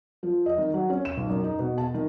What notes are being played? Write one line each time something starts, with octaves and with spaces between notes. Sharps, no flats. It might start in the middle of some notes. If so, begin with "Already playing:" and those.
F3
D#5
D#3
F#3
C#4
E7
B1
F#2
D#4
B2
A5
D#3